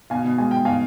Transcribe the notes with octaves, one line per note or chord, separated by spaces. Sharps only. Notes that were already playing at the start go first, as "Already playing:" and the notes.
B2 F5 G#5
B2
G#3 G#5
G#3 G5
B2 F5 G#5